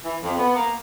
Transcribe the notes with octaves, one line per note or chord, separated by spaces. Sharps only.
E3
F2
B3
A#3